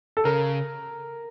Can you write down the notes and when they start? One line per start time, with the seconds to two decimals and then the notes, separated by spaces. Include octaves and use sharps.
0.17 A4
0.25 C#3 A#4